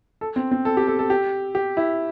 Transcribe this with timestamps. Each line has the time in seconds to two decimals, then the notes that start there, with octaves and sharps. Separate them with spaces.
0.21 A4
0.36 C4
0.51 C4
0.65 A4
0.77 G4
0.87 A4
0.99 A4
1.10 G4
1.55 G4
1.77 E4